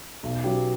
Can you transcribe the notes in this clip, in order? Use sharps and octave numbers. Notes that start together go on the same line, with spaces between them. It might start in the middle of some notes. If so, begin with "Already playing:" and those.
B1
B2 F#3 C#4 G4